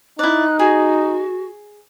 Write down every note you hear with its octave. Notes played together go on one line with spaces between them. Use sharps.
D#4 E4 D5 F#6
F#4 G#4